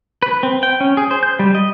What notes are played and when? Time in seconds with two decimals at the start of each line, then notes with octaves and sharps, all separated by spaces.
0.23 B4
0.43 C4
0.63 G5
0.80 C#4
0.97 G#4
1.11 C5
1.23 G6
1.39 G3
1.55 D#5